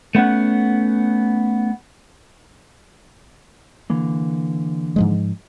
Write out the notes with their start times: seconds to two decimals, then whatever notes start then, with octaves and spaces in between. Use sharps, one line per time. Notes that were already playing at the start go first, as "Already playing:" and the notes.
0.15 A3 B3 C#4 F#5
3.90 D3 E3 A#3
4.96 G#2 F3 G#3